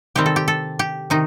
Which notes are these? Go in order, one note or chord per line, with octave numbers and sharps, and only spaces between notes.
C3 D#3 G3 C4 G4
A4
G4
A4
G4
C3 D#3 D#4